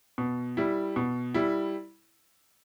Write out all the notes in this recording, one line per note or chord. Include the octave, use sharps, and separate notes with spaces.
B2
G3 E4
B2
G3 E4